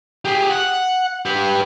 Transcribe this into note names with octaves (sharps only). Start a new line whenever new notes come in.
G4 G#4
F#5
G4 B4